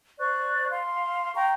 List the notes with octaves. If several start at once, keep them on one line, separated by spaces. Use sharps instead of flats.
C5 D5 C#6 F#6
F5 C6
F5 G5 A#5 C#6